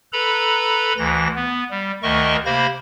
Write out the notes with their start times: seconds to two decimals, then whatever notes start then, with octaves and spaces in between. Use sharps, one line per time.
0.13 A4 B4 A#5 B5
0.98 D2 E3 A#6
1.36 B3
1.71 G3
2.03 D2 D#3 A3 A#4 D#5 C#6
2.45 C3 A#3 C5 B5 A#6